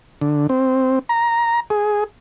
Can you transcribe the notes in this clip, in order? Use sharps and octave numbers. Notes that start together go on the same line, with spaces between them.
D3
C4
A#5
G#4